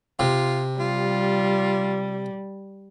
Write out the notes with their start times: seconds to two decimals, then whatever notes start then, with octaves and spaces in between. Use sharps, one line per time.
0.19 C3 F4
0.80 G3 F4